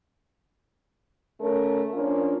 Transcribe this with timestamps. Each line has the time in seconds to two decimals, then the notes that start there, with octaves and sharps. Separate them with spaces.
1.41 C#3 A3 C#4 A#4
1.93 F3 A#3 C#4 D4 F4